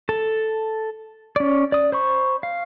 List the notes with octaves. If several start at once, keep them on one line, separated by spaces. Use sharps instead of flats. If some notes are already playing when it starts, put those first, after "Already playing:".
A4 A5
C#4 D5
D5 D#6
C5 B5 C#6
F5